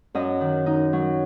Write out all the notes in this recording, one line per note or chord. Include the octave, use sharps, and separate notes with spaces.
F#2 D#5
D#3
D#4
F#3